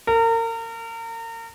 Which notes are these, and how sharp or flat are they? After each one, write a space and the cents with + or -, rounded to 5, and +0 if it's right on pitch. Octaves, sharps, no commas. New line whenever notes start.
A#4 -35